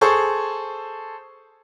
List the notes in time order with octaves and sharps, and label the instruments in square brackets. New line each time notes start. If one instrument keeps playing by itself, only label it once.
[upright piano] G#4 A4 C5 C#6